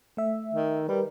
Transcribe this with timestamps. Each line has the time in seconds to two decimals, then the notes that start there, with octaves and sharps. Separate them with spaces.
0.17 A3 E5
0.54 D#3
0.89 G3 A#4 B4